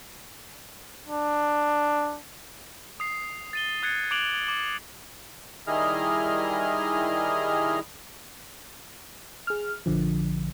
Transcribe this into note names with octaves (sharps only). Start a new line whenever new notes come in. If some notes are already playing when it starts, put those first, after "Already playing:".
D4
D#6 C7
A6 D#7 G7
D#6 F#6 G#6 A6 C7 C#7
D6 F#6 G#6 D7 F7 F#7
D6 F#7
D#3 G3 E4 G#4 D#5 F6
G#4 F6
A#1 D3 F3